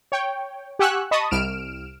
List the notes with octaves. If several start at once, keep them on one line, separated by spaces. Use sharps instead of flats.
C#5 G5
G4 F#5 G#5 C#6 E6 F#6
D#5 A5 B5 C#6 D#6
C2 F6 D7 E7